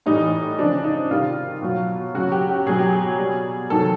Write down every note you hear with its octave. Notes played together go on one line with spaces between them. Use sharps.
A2 E3 G3 D#4
C#3 F3 D4
D#4
C3 D#3 G3 F4
B2 F#3
C#3 F#3 F#4
G4
G4
B2 F#3 G#4
G4
G#4
B2 G3
C3 D#3 F#3 A4